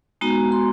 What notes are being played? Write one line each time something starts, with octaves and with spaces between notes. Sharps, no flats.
G#3 B3 D#4 F#4 A#5
C6